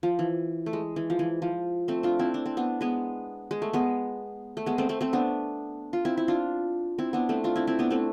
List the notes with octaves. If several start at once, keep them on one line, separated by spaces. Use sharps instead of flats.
F3
E3
A3
G#3
E3
F3
E3
F3
A3 C4
D4 F4
C4 E4
D4
C4
B3 D4
G#3 B3
G#3
A3
G#3 B3
A3
G#3 B3
A3 C4
A3 C4
A3 C4
B3 D4
F4
C4 E4
E4
D4 F4
C4 E4
B3 D4
A3 C4
D4 F4
C4 E4
C4 E4
B3 D4
A3 C4